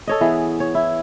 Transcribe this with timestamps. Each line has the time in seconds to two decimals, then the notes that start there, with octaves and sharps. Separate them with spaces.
0.07 A4 C#5 D#5
0.21 E3 B3 G#4
0.60 C#5
0.75 E4